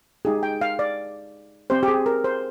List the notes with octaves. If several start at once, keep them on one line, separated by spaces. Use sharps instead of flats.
G#3 D#4 G4 G#4
G5
F5
D5
C4 G4 C5
G4
G#4
A#4
C5